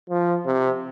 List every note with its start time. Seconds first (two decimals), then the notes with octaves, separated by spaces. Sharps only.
0.10 F3
0.46 C3